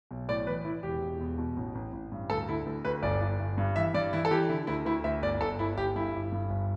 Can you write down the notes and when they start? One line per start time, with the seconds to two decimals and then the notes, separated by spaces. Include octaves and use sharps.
0.11 B1
0.29 A2 D5
0.47 E3 B4
0.65 E3 E4
0.83 E1 G4
1.01 E1
1.20 E2
1.38 B2
1.57 A1
1.75 A1
1.93 A1
2.12 G2
2.30 D2 A4
2.48 D3 E4
2.66 D2
2.85 D2 B4
3.03 G1 D5
3.21 G1
3.40 G1
3.58 G2
3.76 E3 E5
3.94 G2 D5
4.13 E3 E4
4.25 A4
4.31 E3 G4
4.49 D3 E4
4.67 D2 E4
4.85 D2 E4
5.04 D2 E5
5.22 G1 D5
5.41 G1 A4
5.59 G1 E4
5.77 G1 G4
5.96 G2 E4
6.14 G1
6.32 G2
6.50 G1